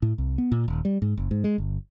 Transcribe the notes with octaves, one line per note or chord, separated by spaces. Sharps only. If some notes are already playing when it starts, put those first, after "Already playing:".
A2
C2
B3
A#2
D#1
G3
G#2
F#1
G#2
G#3
G1